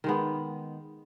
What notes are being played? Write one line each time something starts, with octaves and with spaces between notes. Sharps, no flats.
D#3 G#3 B3